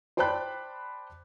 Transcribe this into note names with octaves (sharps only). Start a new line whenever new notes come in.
C5 D5 G5 A5 B5 F#6